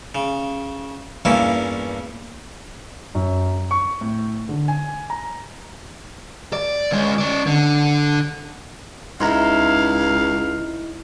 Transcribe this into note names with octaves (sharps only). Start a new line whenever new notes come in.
C#3
E2 G2 A#2 A#3 C#4 E4
F#2
C#6
A2
D3
G#5
A#5
D5
C#2 G#3
C#4 D5
D3
C#2 D#4 E4 F5 A#5 C6